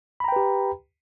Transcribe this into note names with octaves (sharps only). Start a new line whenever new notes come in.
G4 B4 G5 A#5 B5